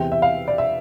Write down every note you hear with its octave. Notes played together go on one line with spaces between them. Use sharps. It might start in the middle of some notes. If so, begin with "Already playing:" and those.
Already playing: E2 C3 E3 G5
E5
F5
D5
E5